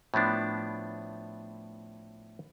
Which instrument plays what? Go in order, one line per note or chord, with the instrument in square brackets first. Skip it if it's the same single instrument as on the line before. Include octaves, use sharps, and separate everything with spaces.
[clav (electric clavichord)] A2 F3 B3 D4